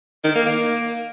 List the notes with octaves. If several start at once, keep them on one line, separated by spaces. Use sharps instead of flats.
D#3
A#3
A#3